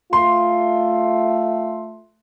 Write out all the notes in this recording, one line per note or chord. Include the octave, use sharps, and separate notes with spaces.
A3 F4 C6